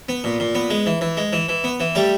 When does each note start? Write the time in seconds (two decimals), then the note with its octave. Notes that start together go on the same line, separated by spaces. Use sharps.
0.09 B3
0.24 A#2
0.40 A#2
0.55 B3
0.70 G#3
0.86 E3
1.01 E3
1.17 G#3
1.33 E3
1.49 E3
1.64 B3
1.80 E3
1.95 G3 A3 G4